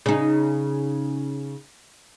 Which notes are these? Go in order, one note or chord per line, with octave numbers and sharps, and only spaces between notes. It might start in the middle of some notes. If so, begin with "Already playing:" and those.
C#3 D#4